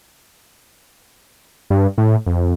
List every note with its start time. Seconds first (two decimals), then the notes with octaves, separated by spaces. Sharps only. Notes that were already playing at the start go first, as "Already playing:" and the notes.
1.70 G2
1.98 A2
2.27 F2